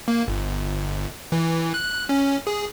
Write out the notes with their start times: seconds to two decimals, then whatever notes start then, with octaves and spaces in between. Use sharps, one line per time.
0.08 A#3
0.28 G1
1.32 E3
1.74 F#6
2.09 C#4
2.47 G#4